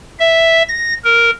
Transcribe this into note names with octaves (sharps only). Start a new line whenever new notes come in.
E5
A#6
A#4